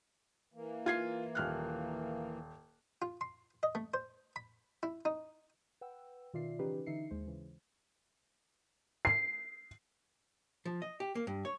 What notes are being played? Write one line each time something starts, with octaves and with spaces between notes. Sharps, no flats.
E3 A#3
F4 G#6 C7
D#1 F6 F#6
F4
C6
D#5
A3
C5
B5
E4
D#4
B4 F#5 G5 E6
B2 D#3 F4 D5 E5 C7
C#3 E3 C#4 D#4 G4 B4
D3 E3 D#4 E5 C7 C#7
D#2 G#3 C5
C#3 E3
C7
F3
D#5
G4
A#3
G2
C#5